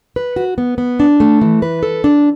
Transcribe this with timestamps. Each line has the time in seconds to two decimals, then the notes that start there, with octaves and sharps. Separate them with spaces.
0.16 B4
0.36 F#4
0.58 B3
0.78 B3
1.00 D4
1.20 A3
1.41 E3
1.62 B4
1.83 A4
2.04 D4